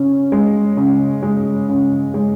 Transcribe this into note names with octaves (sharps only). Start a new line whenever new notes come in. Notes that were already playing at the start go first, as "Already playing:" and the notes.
Already playing: C#3 C#4
G#3
C#3
G#3
C#3
G#3